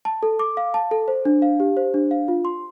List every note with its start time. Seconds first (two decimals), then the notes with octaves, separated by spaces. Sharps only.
0.05 A5
0.23 A4
0.39 D6
0.57 F5
0.74 A5
0.91 A4
1.08 C5
1.25 D4
1.42 F5
1.60 G4
1.77 C5
1.94 D4
2.11 F5
2.28 F4
2.45 C6